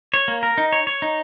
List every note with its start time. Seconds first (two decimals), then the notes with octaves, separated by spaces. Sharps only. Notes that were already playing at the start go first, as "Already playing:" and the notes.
0.14 C#5
0.28 A#3
0.43 A#4
0.58 D#4
0.72 C#5
0.87 C#5
1.02 D#4